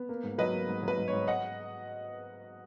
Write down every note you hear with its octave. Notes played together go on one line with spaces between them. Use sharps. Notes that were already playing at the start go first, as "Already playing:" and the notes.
Already playing: B3
A#3
G#2
F#3 B4 D#5
A#3
G#2
F#3 B4
G#2
C#5
G#2
D#5 F#5